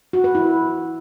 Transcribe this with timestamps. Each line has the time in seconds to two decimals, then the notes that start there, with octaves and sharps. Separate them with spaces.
0.13 F#4
0.24 B4
0.35 E4